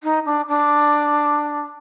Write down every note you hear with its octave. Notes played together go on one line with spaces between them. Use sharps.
D#4
D4
D4